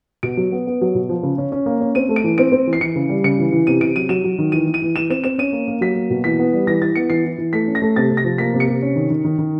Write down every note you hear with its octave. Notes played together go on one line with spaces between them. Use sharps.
B2 D7
F#3
B3
B3
F#3
B2
F3
C#3
C#4
C#4
A#3
C#4
C4 D#7
A3
D7
E3
C4 D7
C4
E3
C7
E3 C#7
C#3
G3
C#3 C#7
E3
E3
C3 D#7
C3 D7
F#3 D#7
F#3 E7
F#3
D#3
E3 D#7
E3
D#7
E3
E3 E7
C4 E7
C4 E7
C#4 D#7
A#3
A#3
F#3 B6
A#3
B2
E3 B6
B3
G3
E3 A#6
E3 A6
B3 C#7
E3 C7
E3
E3
A3 B6
C#4
A#6
A3
C3 A6
C3
A#6
F3
A#3 B6
C3
C#7
C3
C#4
D#3
D#3
D#3
D#3